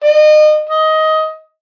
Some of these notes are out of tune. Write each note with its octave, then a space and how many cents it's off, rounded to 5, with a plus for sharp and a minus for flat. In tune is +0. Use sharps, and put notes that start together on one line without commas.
D#5 -30
D#5 +15